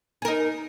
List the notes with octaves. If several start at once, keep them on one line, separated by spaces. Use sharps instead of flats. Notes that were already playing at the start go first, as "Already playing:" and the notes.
D#4 G#4 A#4